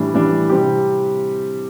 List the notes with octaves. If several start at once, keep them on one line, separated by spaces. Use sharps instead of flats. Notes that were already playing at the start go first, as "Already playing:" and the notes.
Already playing: A2 E3 G3 D4
A2 E3 G3 D4
C3 G3 C4 G4